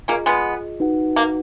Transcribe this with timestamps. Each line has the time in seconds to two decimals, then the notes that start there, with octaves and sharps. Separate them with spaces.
0.08 A#3 C#4 F4 G#4 D#5
0.26 G#3 B3
0.80 D#4 F#4 B4 F#5
1.16 A#3